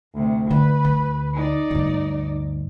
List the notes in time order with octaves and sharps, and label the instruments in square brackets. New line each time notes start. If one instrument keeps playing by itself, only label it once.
[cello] D2 C3
[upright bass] D3 [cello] B4
[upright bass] D2
[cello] D#4 D5
[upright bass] D2 G2